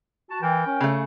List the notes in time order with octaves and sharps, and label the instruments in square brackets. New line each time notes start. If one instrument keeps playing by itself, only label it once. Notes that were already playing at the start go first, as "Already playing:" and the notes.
[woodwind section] F#4 A5
[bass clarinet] E3 [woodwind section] A#4 G5
[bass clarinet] C#4
[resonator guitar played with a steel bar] C#3 A3